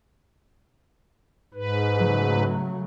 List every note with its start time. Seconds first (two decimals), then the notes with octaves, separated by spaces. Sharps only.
1.54 G#2 B4
1.94 C#3 F#3 A3